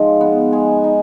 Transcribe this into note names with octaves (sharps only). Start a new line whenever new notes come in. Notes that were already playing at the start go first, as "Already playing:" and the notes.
Already playing: G#2 F3 G#3
B3
G#3 G#5
D#4